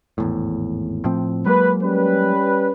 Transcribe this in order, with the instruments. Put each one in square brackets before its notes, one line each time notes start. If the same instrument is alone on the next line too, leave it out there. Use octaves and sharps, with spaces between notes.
[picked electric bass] G#1 E2 A2
A2 F3 C4
[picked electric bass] F#3 G#3 A#3 [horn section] B4
[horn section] G3 C#4 B4